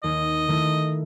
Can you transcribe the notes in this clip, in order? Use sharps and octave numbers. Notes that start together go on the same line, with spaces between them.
D#2 D#5
D#3 A3 E4